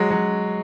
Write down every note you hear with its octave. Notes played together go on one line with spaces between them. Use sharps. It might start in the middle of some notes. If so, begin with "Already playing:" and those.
Already playing: F#3 G#3
F#3